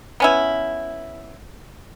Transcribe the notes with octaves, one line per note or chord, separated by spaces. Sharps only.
B3 C#4 E4